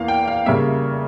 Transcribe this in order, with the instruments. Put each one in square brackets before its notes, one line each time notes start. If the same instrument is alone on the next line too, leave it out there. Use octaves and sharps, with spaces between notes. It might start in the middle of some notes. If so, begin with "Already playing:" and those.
Already playing: [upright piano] E2 E3 A#3 F5
G5
F5
C#3 G3 A#3 E5